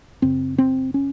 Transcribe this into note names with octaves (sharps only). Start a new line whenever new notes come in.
F#2 C#3 C4
C4
C#4